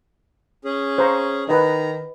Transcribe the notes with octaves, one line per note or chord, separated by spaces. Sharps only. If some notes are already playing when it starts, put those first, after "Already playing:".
C#4 G#4
C5 A#5 C#6
D#3 B4 D#5 A#5